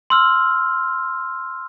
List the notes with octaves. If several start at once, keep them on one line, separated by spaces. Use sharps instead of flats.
C6 E6 F6